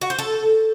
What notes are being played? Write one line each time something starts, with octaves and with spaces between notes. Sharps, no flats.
F#4
C5
A4